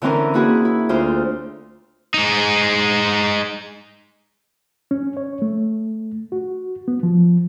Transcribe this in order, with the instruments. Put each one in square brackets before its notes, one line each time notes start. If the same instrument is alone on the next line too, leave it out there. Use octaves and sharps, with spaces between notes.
[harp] D3 E3 C4 C#4 A#4
A#3 E4 F#4 G#4 B4
E4
D2 F4 C5 F6
[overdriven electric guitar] G#3 D#4
[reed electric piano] C#4
C#5
A3
F#4
B3
F3